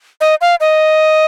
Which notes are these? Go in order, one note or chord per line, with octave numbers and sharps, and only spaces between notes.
D#5
F5
D#5